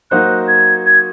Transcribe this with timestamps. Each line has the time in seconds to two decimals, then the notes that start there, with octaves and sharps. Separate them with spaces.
0.11 F#3 A#3 D#4 F#4 C5 F#6
0.48 G#6
0.86 G#6